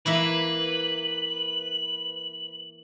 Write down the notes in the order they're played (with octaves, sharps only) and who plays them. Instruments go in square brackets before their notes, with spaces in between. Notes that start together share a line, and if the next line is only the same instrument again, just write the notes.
[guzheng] E3 A#3 E5 [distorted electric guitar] B4 [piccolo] F#7